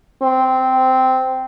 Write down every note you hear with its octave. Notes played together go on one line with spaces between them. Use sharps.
C4